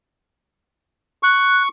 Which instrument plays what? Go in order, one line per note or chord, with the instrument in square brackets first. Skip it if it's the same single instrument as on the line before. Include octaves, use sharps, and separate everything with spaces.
[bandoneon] C#6 [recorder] F#6